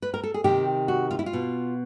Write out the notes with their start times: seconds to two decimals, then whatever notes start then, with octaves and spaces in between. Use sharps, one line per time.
0.02 B4
0.14 A#4
0.24 A4
0.34 G#4
0.44 C3 D#3 G4
0.88 F#4
1.11 F4
1.19 E4
1.26 F4
1.33 B2